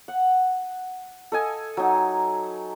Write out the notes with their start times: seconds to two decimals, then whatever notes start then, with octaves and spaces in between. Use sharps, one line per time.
0.08 F#5
1.32 A4 D#5 G#5
1.77 F#3 D#4